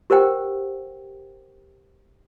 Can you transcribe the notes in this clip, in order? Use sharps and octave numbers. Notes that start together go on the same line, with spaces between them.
G4 A#4 C5 F#5 G5